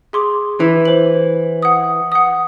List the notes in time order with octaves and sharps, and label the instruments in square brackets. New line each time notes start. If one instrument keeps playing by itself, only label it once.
[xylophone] G#4 C6 D6
[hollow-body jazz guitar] E3
[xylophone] C5 F#7
F#5 D#6
F#5 D#6